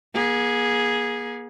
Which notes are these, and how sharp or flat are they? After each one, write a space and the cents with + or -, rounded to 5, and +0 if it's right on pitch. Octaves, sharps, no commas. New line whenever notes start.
A#3 +45 G#4 +0